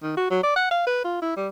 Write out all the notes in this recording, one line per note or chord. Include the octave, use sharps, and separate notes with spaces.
D#3
F#4
F#3
D5
F#5
F5
B4
F4
E4
G3